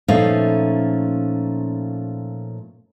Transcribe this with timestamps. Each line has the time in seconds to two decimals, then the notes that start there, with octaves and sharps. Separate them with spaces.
0.08 A#2 F3 A3 C#4 D#4 F5